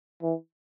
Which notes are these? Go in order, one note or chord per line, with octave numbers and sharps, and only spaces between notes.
E3